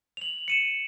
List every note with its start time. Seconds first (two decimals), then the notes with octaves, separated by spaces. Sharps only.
0.17 F7 F#7
0.48 C#7 D#7 E7